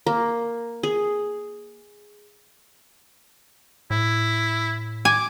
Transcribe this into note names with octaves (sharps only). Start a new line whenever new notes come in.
A#3
G#4
A2 E4
G#5 D6